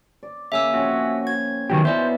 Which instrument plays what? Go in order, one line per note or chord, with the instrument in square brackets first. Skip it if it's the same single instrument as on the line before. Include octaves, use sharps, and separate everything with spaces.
[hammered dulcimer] D5
[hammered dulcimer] C#3 A#3 [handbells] E5 G#5 E6
[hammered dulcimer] F3 C4 C#4 [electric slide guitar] F#4
[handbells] G#6
[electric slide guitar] D#3 F#3 G4 [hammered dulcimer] E3 B3 C#4
[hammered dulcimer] B2 D#4 [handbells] E4 D5 E5 [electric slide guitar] C5